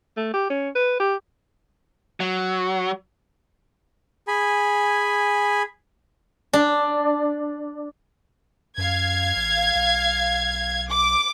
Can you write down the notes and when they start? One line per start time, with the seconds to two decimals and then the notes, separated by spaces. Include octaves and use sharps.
0.17 A3
0.33 G4
0.50 C#4
0.75 B4
1.00 G4
2.20 F#3
4.28 G#4 G#5 B5
6.53 D4
8.78 F#2 F5 G#6
9.36 A1
9.76 B1
10.89 D6